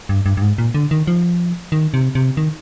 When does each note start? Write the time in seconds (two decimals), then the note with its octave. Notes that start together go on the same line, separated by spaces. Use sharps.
0.09 G2
0.26 G2
0.37 G2
0.42 G#2
0.58 A#2
0.75 D3
0.91 D#3
1.07 F3
1.72 D#3
1.94 C3
2.15 C3
2.37 D#3